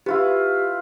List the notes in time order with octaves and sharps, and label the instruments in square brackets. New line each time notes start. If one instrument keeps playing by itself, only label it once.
[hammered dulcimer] E4 F4 B4 [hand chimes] G4